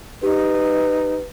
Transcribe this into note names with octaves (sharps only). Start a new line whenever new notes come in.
D#4 G4 B4